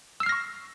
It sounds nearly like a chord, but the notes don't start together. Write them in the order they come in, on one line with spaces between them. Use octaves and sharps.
E6 C7 F6 A#6 C#6